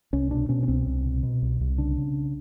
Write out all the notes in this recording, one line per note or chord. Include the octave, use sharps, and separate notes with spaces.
C2 C#4
B2 D4
B2 C#4
C#4
C2 C4
C2
B2
B2
C2
C2
C#3 D4
C#3